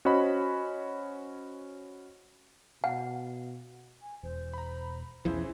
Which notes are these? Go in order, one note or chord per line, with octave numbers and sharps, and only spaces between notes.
C#4 F#4 C5 D#5 B5
B2 F5 F#5
G#5
E1 C5
A#5 B5
B1 E2 E3 F3 C#4 E4 G#4 C5